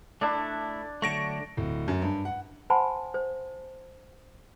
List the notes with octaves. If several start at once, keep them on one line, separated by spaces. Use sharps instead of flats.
A3 D4 E4
D3 F#3 A3 C#6 A#6 D7
D1
F#2
G2
F#5
C5 F#5 G#5 A5 B5 C6
C5